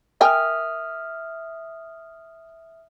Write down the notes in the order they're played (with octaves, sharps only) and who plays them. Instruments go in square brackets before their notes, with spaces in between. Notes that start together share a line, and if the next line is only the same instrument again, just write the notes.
[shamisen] A#4 G5 G#5 [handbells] E5 D#6 F6